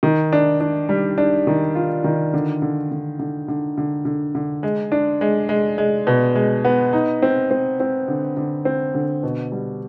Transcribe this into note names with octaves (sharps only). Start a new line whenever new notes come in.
D#3
D4
D4
G3
D4
D#3
F4
D#3
D3
D3
D3
D3
D3
D3
D3
D3
G#3
D4
G#3
G#3
G#3
B2
G#3
B3
D#4
C4
C4
C4
D3
D3
C4
D3
B2
G3